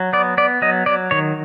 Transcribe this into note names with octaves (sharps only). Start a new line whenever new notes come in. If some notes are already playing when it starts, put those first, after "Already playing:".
Already playing: F#3
B3 D5
B3 D5
F#3 D#5
F#3 D5
D#3 C#5